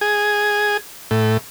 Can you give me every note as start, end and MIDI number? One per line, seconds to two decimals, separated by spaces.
0.01 0.77 68
1.11 1.37 45